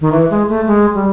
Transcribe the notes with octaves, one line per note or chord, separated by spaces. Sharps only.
D#3
E3
G#3
A3
G#3
G3